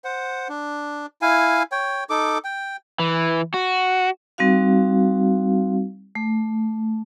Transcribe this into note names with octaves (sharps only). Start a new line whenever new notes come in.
C5 F#5
D4
E4 F5 G#5
C#5 G5
D#4 A4 D6
G5
E3
F#4
G3 C4 D#4 F#4 F5
A3